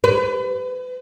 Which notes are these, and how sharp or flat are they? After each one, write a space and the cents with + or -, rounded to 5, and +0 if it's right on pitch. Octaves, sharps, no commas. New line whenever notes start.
B4 +35